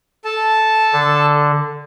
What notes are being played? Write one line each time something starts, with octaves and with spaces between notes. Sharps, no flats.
A4 A5
D3